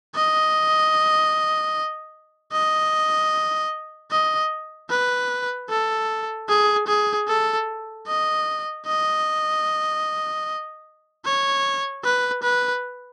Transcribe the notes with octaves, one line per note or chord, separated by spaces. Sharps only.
D#5
D#5
D#5
B4
A4
G#4
G#4
A4
D#5
D#5
C#5
B4
B4